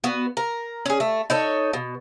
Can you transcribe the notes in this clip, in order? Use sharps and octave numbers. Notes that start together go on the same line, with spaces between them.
B3 F#4
A#4
C#4 G#4
A3
D#4 A4 C#5
B2